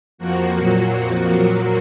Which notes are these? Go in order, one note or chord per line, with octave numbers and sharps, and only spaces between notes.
F2 F3 A#3 F#4
A#2 F#3 A#3
F2 F3 A#3 F#4
A#2 F#3 A#3 F#4